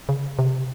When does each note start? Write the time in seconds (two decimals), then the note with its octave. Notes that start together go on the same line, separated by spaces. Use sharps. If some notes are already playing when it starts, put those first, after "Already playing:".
0.09 C#3
0.39 C3